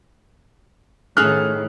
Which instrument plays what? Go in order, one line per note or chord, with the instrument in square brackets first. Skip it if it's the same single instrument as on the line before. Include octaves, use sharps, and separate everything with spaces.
[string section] A2 D#3 [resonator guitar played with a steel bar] C#4 G#4 A4 [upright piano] F6 F#6